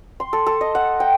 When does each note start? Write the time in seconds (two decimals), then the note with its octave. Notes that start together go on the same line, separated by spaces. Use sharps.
0.20 C6
0.33 A4
0.46 A4
0.61 D#5
0.75 F#5
1.00 G5